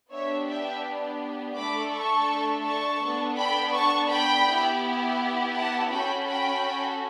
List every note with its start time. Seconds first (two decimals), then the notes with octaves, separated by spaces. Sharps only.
0.11 B3 D4 G4 C#5 E5
0.48 E5 G5
1.56 A3 D4 A4 B5 D6
1.92 A5 C#6
2.65 A5 C#6
3.01 B3 D4 A4
3.37 G5 B5
3.73 A5 C#6
4.09 G5 B5
4.46 B3 E4 G4
5.55 F#5 A5
5.90 C#4 F#4 A4 G5 B5
6.27 G5 B5